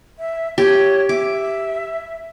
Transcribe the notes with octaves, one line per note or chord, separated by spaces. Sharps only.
E5
G4 C#5
E5 D6